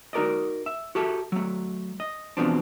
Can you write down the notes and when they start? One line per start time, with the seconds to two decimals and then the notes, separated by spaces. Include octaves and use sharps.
0.13 D#4 F#4 A#4 D5 D#5
0.66 E5
0.95 F#4 G4 A4 E5
1.32 F#3 A3
2.00 D#5
2.37 E2 B2 F3 B3 C4 D4